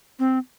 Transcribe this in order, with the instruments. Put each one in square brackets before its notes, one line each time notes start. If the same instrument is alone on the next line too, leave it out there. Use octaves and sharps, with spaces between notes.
[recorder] C4